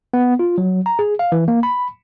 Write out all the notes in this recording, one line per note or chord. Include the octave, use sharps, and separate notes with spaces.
B3
F4
F#3
A#5
G#4
F5
E3
A#3
B5